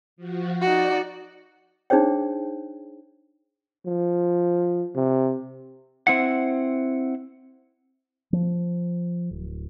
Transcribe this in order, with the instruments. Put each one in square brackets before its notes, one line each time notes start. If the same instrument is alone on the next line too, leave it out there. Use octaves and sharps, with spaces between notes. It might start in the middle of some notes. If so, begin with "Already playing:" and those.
[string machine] F3 F#4
[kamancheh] D#4 F#4 [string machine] D5
[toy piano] D4 D#4 G#4 C5 C#5 G5
[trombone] F3
C3
[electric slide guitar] C4 E4 F#5
[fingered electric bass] F3
D1